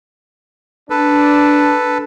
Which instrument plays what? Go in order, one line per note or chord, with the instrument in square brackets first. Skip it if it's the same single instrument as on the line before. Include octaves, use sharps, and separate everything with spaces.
[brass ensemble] D4 [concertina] A4 B4